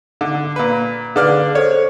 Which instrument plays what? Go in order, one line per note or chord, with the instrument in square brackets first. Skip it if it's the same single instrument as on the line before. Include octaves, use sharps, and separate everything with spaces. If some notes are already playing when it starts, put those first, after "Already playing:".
[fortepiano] D3
A#2 B4
[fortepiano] D3 D5 F6 [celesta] G#4 B4 F5
[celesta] A4 C5 [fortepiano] C#5